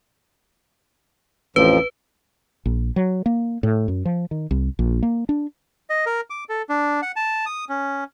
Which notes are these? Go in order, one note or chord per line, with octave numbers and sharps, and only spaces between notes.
A1 F2 F3 B4
A#1
F#3
A#3
A2
F#2
F3
D#3
C2
A#1
A#3
D4
D#5
A#4
D6
A4
D4
F#5
A5
D#6
C#4